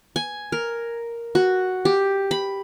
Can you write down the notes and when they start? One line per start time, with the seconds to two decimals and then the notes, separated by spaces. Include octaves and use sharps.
0.16 G#5
0.52 A#4
1.35 F#4
1.85 G4
2.31 B5